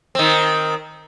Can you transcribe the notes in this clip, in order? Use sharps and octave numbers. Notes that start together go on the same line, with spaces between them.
D#3 C4